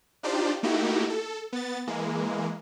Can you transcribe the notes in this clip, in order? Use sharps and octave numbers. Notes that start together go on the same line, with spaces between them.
D4 D#4 F4 G4 C5 D5
A3 A#3 D#4 E4 F#4 G4
A4
B3 A6
E3 G#3 A#3